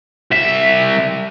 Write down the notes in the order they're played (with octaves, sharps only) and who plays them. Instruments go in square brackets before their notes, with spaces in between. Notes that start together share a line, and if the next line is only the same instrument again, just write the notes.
[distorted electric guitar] C2 E5